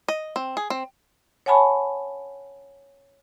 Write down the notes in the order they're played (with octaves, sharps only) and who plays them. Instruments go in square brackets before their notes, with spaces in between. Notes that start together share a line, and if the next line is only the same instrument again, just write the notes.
[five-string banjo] D#5
C4
G#4
C4
[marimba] C#5 F#5 G#5 A5 B5 C#6